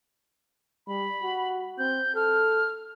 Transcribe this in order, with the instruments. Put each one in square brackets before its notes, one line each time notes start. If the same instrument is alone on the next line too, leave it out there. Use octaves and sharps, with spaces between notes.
[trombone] G3 [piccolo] B5
[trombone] F#4
[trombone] C4 [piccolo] G6
[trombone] A4 [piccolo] F6